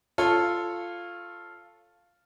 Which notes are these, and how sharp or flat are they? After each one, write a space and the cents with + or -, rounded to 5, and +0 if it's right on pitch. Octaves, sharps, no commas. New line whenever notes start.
F4 -5 A4 +0 C#5 -20